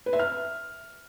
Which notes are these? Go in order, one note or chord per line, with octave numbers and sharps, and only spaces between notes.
B4
E5
F6